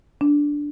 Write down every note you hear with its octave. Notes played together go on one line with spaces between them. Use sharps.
D4